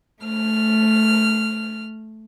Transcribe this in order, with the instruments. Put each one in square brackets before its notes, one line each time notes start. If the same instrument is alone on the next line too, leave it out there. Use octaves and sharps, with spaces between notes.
[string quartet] A3 F6